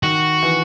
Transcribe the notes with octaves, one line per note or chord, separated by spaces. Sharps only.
D#3 F#4
E3